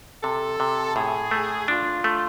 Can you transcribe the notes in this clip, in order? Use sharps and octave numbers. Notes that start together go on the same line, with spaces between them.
C3 A4
C3
A2 G#4
A3
D4 F4
A3